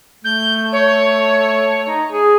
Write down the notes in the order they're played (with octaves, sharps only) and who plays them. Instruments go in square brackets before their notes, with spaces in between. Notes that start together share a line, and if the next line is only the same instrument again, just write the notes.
[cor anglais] A3 [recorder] G6
[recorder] C#5
[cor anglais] D#4
G#4